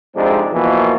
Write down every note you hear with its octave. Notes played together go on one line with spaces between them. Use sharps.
F2 C3 G#3 C4 D4 D#4
B2 E3 F3 A#3